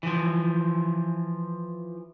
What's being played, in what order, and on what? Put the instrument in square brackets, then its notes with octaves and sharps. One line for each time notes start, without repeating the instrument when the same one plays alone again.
[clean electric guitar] E3 F3